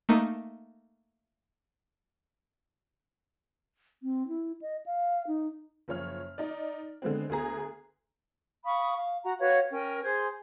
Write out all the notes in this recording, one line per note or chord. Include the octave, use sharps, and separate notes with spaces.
A3 A#3 D#4
C4
E4
D#5
F5
D#4
F#1 F3 C#5 F6
D#4 D5
D3 G#3 B3 C4
D2 B3 G#4 A#5
F5 B5 C#6 D#6
F5
F#4 F#5 A#5
F#4 B4 C#5 F5
C#4 A#4 G5
G#4 C5 C6 G#6